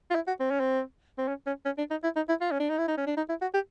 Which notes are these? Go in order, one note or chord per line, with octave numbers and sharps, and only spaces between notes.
F4
E4
F#4
C4
C#4
C4
C4
C#4
C#4
C#4
D4
D#4
E4
D#4
E4
F4
C#4
D4
D#4
E4
D#4
C#4
D4
D#4
E4
F#4
G4